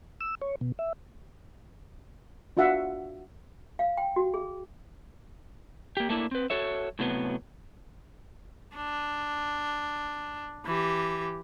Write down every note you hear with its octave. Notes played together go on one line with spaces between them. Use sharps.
E6
C#5
B2
E5
D4 F4 F#4 E5 F#5
F5
G5
F#4
G#4
A#3 G4
A3 A#3 D4 E4
C4 B4
F#4 A4 C#5 E5
A2 C3 F#3 A#3 B3
D4
E3 G4